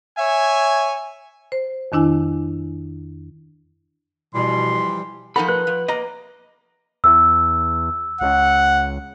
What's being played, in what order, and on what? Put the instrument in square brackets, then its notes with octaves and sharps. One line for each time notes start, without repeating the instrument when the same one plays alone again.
[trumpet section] C#5 E5 G#5
[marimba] C5
F2 D#3 D4 E4 G#5
[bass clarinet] B2 [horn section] E3 F3 G3 [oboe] C6
[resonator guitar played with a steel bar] F3 D#4 F#5 [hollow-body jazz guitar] A4 A#4 C5 [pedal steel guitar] B5
[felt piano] B4 [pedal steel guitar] F#6
[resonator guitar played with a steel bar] F3
[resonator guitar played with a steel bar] A#3 [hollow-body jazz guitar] D#5 A#5
[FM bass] E2 [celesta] E6
[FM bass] C#2 [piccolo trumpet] F#5